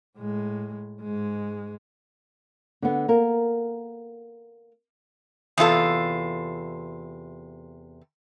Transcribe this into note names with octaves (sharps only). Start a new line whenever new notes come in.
A2 G#3
G#2 G#3
D3 B3
A#3 A#4
E2 C3 F4 A4